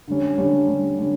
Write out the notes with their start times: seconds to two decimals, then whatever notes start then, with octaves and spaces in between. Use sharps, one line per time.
0.08 D3 G3 C#4
0.38 D3 G3 C#4
0.69 D3 G3 C#4
0.98 D3 G3 C#4